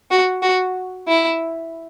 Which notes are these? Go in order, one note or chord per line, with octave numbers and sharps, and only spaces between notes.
F#4
F#4
E4